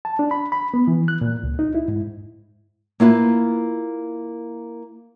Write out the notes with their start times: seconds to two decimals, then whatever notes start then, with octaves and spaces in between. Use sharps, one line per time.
0.05 A5
0.19 D4
0.31 B5
0.52 B5
0.74 B3
0.88 E3
1.08 F#6
1.21 A#2
1.43 C#2
1.59 D#4
1.75 E4
1.88 G#2
3.00 A#3 E4 F4 B4